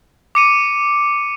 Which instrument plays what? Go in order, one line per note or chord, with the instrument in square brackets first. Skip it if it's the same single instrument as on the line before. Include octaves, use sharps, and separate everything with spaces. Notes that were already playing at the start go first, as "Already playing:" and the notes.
[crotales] D6 C#7 D#7